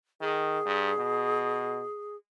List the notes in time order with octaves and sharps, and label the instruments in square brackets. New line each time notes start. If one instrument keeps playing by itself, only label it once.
[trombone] D#3 [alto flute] G#4
[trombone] G2
B2